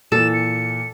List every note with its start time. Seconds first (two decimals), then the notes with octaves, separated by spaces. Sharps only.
0.12 A#2 E3 A4 E7
0.34 C#7